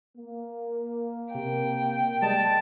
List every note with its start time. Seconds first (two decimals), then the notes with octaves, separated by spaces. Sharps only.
0.18 A#3
1.35 C3 G5
2.22 G3 G#3 D#5 A5